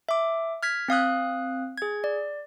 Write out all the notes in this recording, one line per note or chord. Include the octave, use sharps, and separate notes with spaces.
E5 D6
F6 G#6 B6
C4 F5 D#6 F#6
G#4 G#6
D5